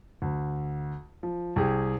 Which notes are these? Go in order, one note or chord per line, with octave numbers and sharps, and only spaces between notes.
D2
F3
C2 G4 G#4 G5